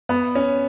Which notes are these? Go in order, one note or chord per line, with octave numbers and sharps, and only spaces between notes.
B3
C#4